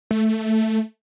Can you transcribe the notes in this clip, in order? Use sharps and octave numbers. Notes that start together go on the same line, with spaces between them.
A3